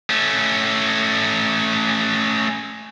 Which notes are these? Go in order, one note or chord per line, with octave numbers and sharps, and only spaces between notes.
A3 C#4